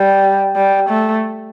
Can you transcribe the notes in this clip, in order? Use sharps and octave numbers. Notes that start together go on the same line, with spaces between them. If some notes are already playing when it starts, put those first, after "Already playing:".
Already playing: G3
G3
A3